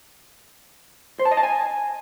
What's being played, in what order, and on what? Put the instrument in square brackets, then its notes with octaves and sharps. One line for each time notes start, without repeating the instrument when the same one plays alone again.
[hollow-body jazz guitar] C5
A5
D#5
A5
G#5